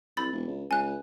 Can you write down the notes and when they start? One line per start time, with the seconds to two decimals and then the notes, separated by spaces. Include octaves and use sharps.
0.17 C2 B5 A6
0.32 E1
0.47 C#2
0.71 C#2 G#5 F#6